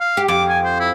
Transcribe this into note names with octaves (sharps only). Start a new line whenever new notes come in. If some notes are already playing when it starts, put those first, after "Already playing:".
F5
G4
F2 D6
G#5
C5
E4